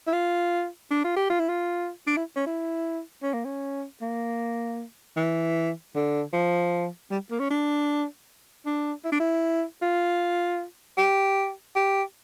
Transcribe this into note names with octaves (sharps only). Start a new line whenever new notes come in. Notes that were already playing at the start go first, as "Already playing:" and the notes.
E4
F4
D4
F4
G4
F4
E4
F4
D4
E4
C#4
E4
C#4
A#3
C#4
A#3
E3
D3
F3
G3
A#3
C#4
D4
D4
E4
D4
E4
F4
G4
G4